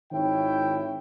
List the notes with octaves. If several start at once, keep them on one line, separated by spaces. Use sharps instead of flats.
G#1 D#3 E4 C#5 G5